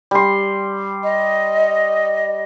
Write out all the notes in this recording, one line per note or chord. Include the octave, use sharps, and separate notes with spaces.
G3 C6
D#5